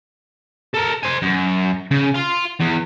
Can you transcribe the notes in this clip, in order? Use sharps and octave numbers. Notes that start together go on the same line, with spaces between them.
A4 A#4
C5 G#5
F#2
C#3
F5 C6
E2